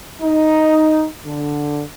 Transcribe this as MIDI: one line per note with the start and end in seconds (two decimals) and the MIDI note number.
0.22 1.05 63
1.25 1.82 50